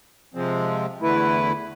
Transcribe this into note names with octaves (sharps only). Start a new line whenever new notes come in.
C3 F3 G#3 C4
E2 D3 A3 E4 B4